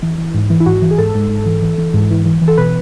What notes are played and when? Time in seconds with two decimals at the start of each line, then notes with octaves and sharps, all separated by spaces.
0.03 E3
0.18 E3
0.34 G#2
0.50 E3
0.60 E4
0.66 G#2 F#4
0.82 E3
0.91 G#4
0.98 G#2 A4
1.15 G#2
1.30 G#2
1.46 E3
1.62 E3
1.78 E3
1.94 G#2
2.11 E3
2.26 E3
2.41 E3
2.48 A4
2.57 B2 B4